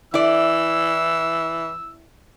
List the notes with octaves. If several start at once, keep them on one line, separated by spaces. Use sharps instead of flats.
E3 E4 D5 E6